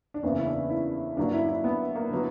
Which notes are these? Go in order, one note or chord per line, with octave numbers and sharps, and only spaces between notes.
D4
F#1 E2 C#3 E3 A#3 C#4
E4
D4
E4
G2 D3 F#3 A#3 C#4 D4
E4
D4
E4
B3
A#3
D3 F#3 B3